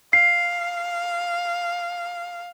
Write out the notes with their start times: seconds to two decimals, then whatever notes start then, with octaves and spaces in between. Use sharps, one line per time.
0.13 F5 C7